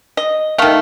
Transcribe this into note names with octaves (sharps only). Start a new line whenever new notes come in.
D#5
D#3 A3 F5